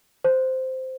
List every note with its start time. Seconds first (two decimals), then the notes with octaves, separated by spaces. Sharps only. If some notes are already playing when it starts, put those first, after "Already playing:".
0.24 C5